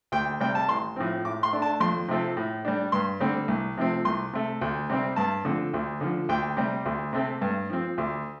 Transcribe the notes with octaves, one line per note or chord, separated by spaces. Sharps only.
D2 G5
C3 G3 G5
A5
A1 C6
A2 F3 C4
A2 D6
C6
A3 D4
A5
F2 C6
C3 F3 A3 C4
A2
G3 D4
G2 C6
D3 G3 C4
C2
C3 F3 A3 C4
C2 C6
C3 A3
D2
C3 G3 C4
G2 A5
D3 F3 C4
D2
D3 F3
D2 G5
C3 G3
D2
C3 A3 C4
G2
F3 C4
D2